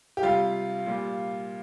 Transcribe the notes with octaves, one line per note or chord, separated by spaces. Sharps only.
G4
C3 G3 F4
A#2 G3